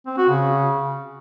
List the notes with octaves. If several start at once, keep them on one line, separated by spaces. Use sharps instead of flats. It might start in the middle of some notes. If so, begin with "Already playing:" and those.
C4
F#4
C#3